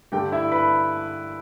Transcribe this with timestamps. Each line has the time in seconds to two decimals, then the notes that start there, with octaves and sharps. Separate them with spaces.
0.12 G2 D3 A3 G4 G5
0.32 E4 E5
0.52 B4 B5